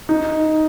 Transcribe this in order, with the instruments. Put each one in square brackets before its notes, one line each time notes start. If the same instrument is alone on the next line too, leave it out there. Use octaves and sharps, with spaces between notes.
[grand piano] D#4